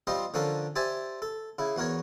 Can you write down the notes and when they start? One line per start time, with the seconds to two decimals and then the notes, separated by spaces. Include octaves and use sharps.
0.07 G3 C4 F4 C5 D#5
0.34 D3 F3 C#4 D4 A4 A#4
0.76 G4 C5 D5 E5 G#5 A5
1.22 A4
1.59 C#3 E4
1.76 E2 F#4 A#4 C#5